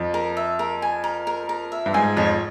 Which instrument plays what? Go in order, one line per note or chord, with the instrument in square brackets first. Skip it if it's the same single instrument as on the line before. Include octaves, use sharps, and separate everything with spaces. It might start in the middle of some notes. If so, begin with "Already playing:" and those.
Already playing: [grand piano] F2
[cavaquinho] A#4
E5
A#4
G#5
A#4
A#4
A#4
E5
[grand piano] G2
[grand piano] G#2 [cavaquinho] G#5
[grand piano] F2 [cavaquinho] C#5